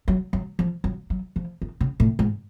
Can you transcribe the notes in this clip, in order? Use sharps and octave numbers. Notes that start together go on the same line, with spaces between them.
F#3
F#3
F3
F#3
F#3
F3
D#3
C#3
A2
G#2